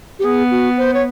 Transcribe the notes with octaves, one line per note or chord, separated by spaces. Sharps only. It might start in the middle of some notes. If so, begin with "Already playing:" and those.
G4
B3 G#4
F#4
C5
C#5